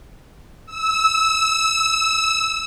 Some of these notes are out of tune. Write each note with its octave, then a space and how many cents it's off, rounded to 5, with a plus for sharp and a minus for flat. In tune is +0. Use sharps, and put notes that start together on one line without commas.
E6 -20